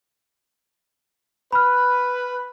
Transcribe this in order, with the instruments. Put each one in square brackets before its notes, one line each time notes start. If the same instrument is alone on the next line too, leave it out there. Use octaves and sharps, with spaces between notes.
[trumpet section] B4 [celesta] B5 F6